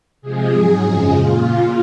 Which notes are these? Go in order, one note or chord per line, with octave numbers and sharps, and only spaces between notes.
C3 F3 G#3 G#4
G#2 F#3
F#2 C#3 F3 G#3 G#4
A#2 F4